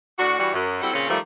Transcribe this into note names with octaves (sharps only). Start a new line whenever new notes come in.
A2 D4 F#4
E3 G3 F#4
F#2
G3 C4 E4 F#4 A4
A#2 C#3 C4 C#4
D#3 F3 G3 A3